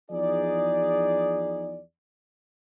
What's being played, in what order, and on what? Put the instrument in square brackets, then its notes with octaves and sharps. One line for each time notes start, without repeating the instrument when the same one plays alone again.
[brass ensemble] E2 F3 D#4 G#4 D5